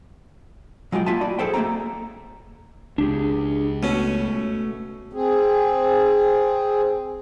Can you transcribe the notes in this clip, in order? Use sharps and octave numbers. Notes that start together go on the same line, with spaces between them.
F#3 G#3 F4 E5 G5
A#3 F4 E5 G#5 A5
F#4 D5 G5 B5
G#4 A4 C5 G5
A3 A#3 C4 G5 A#5
C#2 D4 G4 G#4
B2 A3 C#4
C4 G#4